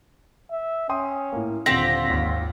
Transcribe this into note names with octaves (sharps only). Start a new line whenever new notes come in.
E5
C#4 G5 C6 D#6
A2 A#3
D#1 D3 C4 F4 G4 A#6 B6
G#1 D#2